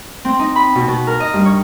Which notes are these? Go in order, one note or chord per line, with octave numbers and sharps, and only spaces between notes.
C4
D#4
B5
B2
B2
A#4
D#5
G2
C#5